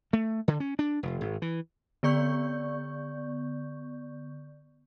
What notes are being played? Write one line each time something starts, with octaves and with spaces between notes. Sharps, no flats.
A3
D3
C#4
D4
F1
G#1
E3
D3 B3 D5 C#6 G6